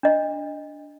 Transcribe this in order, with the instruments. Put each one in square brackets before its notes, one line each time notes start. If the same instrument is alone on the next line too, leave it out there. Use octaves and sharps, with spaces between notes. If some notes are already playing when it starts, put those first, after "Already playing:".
[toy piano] D4 D#5